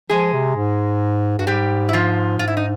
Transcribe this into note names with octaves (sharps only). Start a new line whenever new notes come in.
F3 G#3 G#4
C3
G#2
G2 F#4
G#2 G3 G4
E4
F3 F4
G#2 F4
E4
D#4